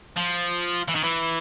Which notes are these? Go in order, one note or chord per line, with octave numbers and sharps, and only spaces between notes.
F3
E3
D#3
E3